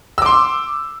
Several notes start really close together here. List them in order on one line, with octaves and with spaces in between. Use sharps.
E6 D6 C6